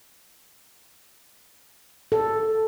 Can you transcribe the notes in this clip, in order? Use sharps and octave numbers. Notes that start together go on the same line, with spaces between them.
A4